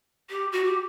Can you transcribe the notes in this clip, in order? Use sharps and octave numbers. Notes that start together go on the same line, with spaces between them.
G4
F#4
G4